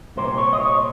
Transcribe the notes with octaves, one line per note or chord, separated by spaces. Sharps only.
C2 A#2 G#3 C4 C5
C#5
D#5
C#5